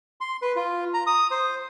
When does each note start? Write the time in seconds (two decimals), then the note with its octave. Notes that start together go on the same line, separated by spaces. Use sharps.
0.21 C6
0.42 B4
0.56 F4
0.94 A#5
1.07 D#6
1.31 C5